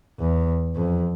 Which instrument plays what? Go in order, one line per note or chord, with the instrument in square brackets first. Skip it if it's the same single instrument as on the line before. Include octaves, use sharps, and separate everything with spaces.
[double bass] E2
F2